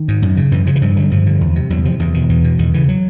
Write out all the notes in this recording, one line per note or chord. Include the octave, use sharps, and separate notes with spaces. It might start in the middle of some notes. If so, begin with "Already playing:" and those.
Already playing: D#3
G#2
F#2
C#3
F#2 E3
C#3 F3
E3
G2 F3
D3 F#3
G2 F3
D3
E2
C3
E2 F#3
C3 F3
E2 E3
B2 D#3
E2 E3
B2
E2 D#3
C#3 E3
F#3